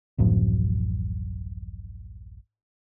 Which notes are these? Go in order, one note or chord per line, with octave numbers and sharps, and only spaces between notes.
D1 A1 F#2 F3